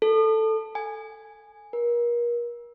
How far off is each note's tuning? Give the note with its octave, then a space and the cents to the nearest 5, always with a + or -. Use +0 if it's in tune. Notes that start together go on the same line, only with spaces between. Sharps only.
A4 +5
G#5 -5
A#4 +35